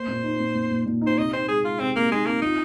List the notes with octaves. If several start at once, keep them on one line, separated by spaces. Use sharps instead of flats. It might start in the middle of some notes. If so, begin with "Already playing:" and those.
Already playing: A#3 C5
A#2
D#4
A#2
A#2
A#2
A#2
D#4
C5
C3 D#5
D#4 C5
G#3 G#4
G#3 F4
C3 C4
C3 A#3
G#3 D#4
A#3 C4
D#4 F4